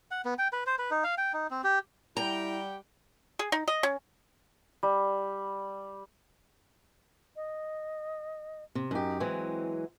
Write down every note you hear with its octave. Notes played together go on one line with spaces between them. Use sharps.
F#5
B3
G5
B4
C5
B4
D#4
F5
G5
D#4
C4
G4
G3 E4 G4 F#5 G5 A#5
G#4
D#4
D#5
C#4
G3
D#5
C3
F#2 D#4 G4
E3 F#3 G#3 C4